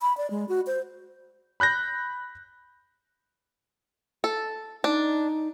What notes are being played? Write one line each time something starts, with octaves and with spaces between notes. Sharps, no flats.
B5
D5
G#3
F#4
C5
B5 F#6 G6 A#6
A4
D4 D#4